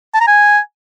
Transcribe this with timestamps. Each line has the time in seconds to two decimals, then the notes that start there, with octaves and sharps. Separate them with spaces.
0.14 A5
0.21 A#5
0.27 G#5